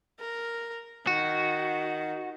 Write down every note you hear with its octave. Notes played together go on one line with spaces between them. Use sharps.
A#4
D#3 F#4